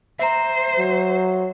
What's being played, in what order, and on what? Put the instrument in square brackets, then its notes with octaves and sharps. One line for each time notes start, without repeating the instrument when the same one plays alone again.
[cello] C5 [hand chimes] E5 A#5
[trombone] F#3